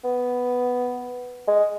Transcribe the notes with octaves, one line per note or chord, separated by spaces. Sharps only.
B3
G#3